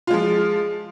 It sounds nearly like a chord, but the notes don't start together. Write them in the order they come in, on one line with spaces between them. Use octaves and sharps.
F4 G#3 F3